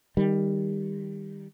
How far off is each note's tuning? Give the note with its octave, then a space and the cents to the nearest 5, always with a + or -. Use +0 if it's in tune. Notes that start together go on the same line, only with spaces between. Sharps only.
D#3 +0 G3 +15